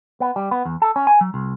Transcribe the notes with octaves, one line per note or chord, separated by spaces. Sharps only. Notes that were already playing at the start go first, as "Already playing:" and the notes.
B3
G3
B3
E2
A4
C#4
G#5
F#3
C2